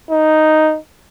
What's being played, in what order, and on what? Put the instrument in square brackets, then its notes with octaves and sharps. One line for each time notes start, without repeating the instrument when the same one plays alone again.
[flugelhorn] D#4